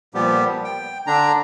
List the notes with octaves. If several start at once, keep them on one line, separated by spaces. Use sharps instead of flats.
A#2 F3 G3 B3 G4
G5
D3 D4 A#5